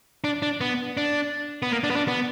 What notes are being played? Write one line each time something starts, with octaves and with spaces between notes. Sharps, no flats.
D4
D4
B3
D4
B3
A#3
D4
B3
D4
B3